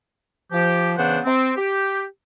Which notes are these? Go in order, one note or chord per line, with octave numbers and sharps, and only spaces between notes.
F3 G4
C#3 E3 B3 D4 C5 F#5
C4
G4